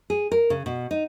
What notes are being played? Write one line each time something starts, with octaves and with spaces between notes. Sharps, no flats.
G#4
A#4
C#3
B2
D#4